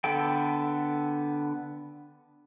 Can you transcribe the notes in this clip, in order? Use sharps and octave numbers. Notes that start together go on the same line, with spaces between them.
D3 B3 A4 G5